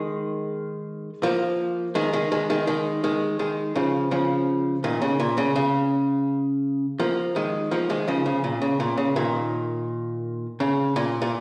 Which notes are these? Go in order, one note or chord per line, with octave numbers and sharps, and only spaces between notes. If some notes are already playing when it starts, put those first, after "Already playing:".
Already playing: D#3 G#3
F3 A#3
D#3 G#3
D#3 G#3
D#3 G#3
D#3 G#3
D#3 G#3
D#3 G#3
D#3 G#3
C#3 F3
C#3 F3
A#2 D#3
C#3
A#2
C#3
C#3
F3 A#3
D#3 G#3
F3 A#3
D#3 G#3
C#3 F3
C#3
A#2
C#3
A#2
C#3
A#2 D#3
C#3
A#2
A#2